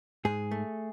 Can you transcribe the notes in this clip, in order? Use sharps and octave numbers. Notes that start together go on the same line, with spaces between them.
G#2 G#4
A3